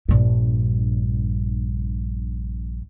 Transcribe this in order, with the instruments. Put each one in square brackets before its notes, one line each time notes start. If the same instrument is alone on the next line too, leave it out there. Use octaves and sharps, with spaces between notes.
[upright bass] A#1 G2